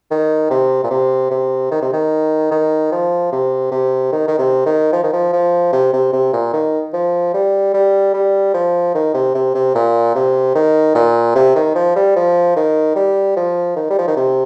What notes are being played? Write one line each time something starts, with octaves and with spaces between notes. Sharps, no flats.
D#3
C3
A#2
C3
C3
D#3
C3
D#3
D#3
F3
C3
C3
D#3
D#3
C3
D#3
F3
D#3
F3
F3
C3
C3
C3
A#2
D#3
F3
G3
G3
G3
F3
D#3
C3
C3
C3
A#2
C3
D#3
A#2
C3
D#3
F3
G3
F3
D#3
G3
F3
D#3
G3
F3
D#3
C3